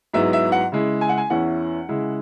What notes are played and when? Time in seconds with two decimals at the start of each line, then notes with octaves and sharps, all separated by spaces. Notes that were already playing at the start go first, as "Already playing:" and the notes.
0.13 G#2 F#3 B3 E4 E5
0.33 E5
0.52 F#5
0.72 C#3 G#3 E4
1.01 G#5
1.09 F#5
1.18 G#5
1.30 E2 E3 C#4 E4 F#5
1.89 C#3 G#3 E4